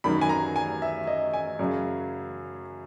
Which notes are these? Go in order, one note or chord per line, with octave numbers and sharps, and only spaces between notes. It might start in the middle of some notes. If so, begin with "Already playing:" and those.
F#2 D#3 F#3 B5
G#5
A#5
G#5
E5
D#5
G#5
F#2 C#3 F#3